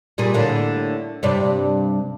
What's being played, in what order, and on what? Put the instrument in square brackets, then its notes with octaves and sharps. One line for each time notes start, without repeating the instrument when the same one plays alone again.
[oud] A#2 G3 G#4
A2 D3 A#3
G2 C3 D5